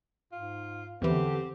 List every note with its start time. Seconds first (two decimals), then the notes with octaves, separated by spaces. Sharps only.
0.32 G#2 F4
1.02 E2 D3 E3 C4 G4